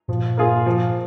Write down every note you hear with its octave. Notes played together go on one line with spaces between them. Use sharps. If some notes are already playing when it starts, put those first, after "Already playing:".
G2 A#2 F3
A#3 F4 G#4
F3